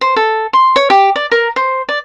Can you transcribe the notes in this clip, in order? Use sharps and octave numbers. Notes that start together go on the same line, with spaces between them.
C5
A4
C6
C#5
G4
D5
A#4
C5
D5